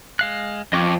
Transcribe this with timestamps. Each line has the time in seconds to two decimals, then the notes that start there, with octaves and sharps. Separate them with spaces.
0.19 G#3 F5 F#6
0.73 F2 D#5 C#6 D6